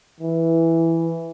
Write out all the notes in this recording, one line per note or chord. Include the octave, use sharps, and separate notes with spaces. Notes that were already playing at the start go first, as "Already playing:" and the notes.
E3